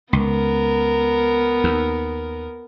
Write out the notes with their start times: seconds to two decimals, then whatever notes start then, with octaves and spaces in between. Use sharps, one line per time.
0.13 C#2 B3 A#4
1.64 D#2